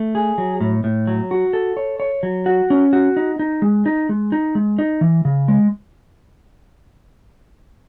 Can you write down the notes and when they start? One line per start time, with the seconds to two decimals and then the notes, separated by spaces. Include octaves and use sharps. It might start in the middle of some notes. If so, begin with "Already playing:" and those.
Already playing: A3
0.15 G#4
0.38 F#3
0.61 A2
0.84 A2
1.07 F#3
1.31 F#4
1.53 A4
1.77 C#5
2.00 C#5
2.23 F#3
2.46 F#4
2.70 C#4
2.93 F#4
3.16 D#4
3.39 D#4
3.62 G#3
3.86 D#4
4.09 G#3
4.32 D#4
4.55 G#3
4.79 D#4
5.01 E3
5.25 C#3
5.48 G#3